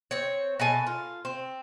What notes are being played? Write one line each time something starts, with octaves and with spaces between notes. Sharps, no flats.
C4 C#5
B2 A4 G#5 A5
F4
C4